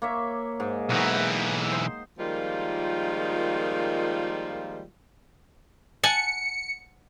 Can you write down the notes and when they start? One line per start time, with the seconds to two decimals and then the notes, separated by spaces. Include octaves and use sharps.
0.02 A#3 C#5 E5
0.60 G#2
0.90 B1 E3 D#4 F#4
1.14 G5
1.72 C5
2.19 D#3 F3 G3 G#3 A#3 F4
6.03 F#5 G#5 A5 C#7